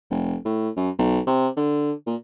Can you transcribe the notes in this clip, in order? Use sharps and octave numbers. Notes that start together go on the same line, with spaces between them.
F1
A2
F#2
B1
C3
D3
A#2